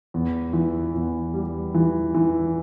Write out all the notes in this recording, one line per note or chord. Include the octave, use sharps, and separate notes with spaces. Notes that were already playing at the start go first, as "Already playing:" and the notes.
E2
E3
E2
G3
E3
E3